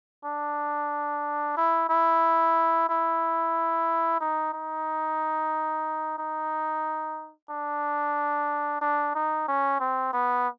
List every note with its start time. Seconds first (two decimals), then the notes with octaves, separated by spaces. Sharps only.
0.25 D4
1.57 E4
1.89 E4
2.89 E4
4.20 D#4
4.53 D#4
6.18 D#4
7.50 D4
8.81 D4
9.15 D#4
9.48 C#4
9.80 C4
10.13 B3